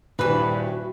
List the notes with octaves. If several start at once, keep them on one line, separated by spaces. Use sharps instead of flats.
D#1 G2 E3 F#4 B4